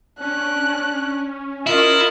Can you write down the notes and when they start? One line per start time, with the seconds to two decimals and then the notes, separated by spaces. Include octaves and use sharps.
0.20 C#4 D4 F#6
1.67 E4 F4 A#4 D#5 D#6